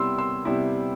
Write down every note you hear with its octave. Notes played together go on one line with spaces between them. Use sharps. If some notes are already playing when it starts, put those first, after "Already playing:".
Already playing: C3 G3 B3 E4 C6 E6
C6 E6
C3 G3 B3 E4